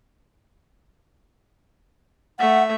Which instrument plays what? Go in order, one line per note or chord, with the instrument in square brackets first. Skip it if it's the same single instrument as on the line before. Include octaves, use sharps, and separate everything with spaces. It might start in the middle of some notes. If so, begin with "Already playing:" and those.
[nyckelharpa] A3 E5 [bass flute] F#5